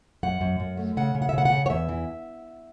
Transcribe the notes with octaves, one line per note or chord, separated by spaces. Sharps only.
F#2 F#5
F#2
F#2
A3
C#3 F#5
C#3
F#5
E5
C#3 F#5
F#5
C#3
C#5
E2 E5
E3